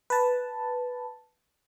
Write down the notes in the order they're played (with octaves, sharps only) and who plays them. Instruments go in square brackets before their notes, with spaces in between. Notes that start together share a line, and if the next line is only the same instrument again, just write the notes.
[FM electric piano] B4 A5